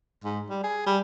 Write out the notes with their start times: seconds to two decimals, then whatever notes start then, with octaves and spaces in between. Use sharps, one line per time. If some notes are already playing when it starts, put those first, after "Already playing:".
0.24 G#2
0.50 G3
0.63 G#4
0.86 G3